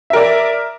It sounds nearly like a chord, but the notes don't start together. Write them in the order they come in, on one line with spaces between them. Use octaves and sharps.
E5 A#4 D5